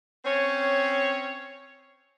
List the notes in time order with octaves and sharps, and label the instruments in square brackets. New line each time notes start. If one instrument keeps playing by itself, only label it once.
[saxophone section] C4 C#4 C#5